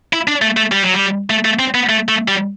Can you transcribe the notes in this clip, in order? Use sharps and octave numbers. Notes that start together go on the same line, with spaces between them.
E4
D4
A3
A3
G3
F#3
G3
A3
A3
C4
B3
A3
A3
G3